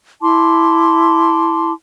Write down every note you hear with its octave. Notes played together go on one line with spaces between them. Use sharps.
E4 A5 C6 D6